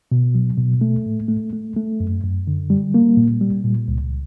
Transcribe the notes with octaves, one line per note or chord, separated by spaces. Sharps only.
B2
F#3
B2
A3
A2
A3
A3
A3
F#2
F#2
D3
G3
A#3
A#2
G3
A#2
C#2